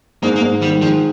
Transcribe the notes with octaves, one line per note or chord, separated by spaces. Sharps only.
G#2 A#3
A#3
G#2
D#3 G3
G#2 F3